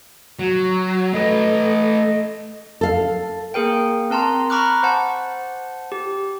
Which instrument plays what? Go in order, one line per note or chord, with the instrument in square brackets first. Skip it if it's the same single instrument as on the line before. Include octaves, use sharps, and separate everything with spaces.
[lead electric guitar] F#3 [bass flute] F#4
[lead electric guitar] A3 B4 [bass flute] A4 [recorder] D#5
[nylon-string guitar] A4 F5
[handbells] A#3 G#4 A#4 G5
C4 A#4 A5 A#5 C6
A#5 B5 C#6 D6 F6 F#6
C5 F#5 A5
G4